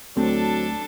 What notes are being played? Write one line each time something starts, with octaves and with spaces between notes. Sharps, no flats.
D2 F#3 A3 C4 D4 A4